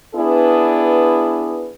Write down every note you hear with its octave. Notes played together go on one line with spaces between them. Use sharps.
B3 D4 E4 G#4 B4